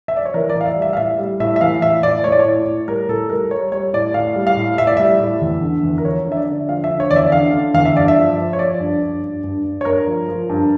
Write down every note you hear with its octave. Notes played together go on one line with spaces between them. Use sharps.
E5
D5
C#5
E3 A#4
D5
A2
F5
E5
G3
E5
F5
A2 E5
G3
A2 E5
E5
E3 F5
A2 E5
A2 D5
A2 C#5
D5
C#5
A2
A2
G3 A#4
A2 A4
G3 A#4
G3 C#5
G3 C#5
A2 D5
A2 F5
G3
F5
A2
A2 E5
D5
G3 E5
A2
E2
D3
E2
A#4
F3 C#5
D3
E5
D5
D3
F3 F5
E5
D3
C#5
E2 D5
E5
D3 F5
D3
E2 F5
E5
G2 D5
E5
F3
F3
C#5
F3 D5
G2
G2
G2
G2
G2
C#5
G2 A#4
F3
F3
G2